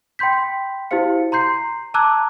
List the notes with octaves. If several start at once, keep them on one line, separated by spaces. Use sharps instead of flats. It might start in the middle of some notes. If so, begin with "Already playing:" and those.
G5 B5 C6 G6 B6
E4 F#4 G4 C5 F5 C#7
A#5 C6 G6 C7
A5 A#5 D6 E6 F#6 G#6